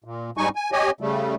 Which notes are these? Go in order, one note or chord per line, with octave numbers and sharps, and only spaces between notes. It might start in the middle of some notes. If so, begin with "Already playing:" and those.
A#2
G#2 G3 D#4 G#5 C#6
G#5
G4 C#5 D#5 G#5
C#3 G3 A3